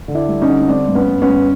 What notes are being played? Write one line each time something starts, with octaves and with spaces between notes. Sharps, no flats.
D3
D4 E4
G3
C#4 D#4
D3
C#4
G3 C4 D4
G2
B3 C#4
G2
B3 C#4
G2